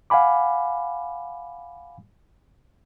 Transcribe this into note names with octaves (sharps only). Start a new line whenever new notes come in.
F5 F#5 G#5 B5 D6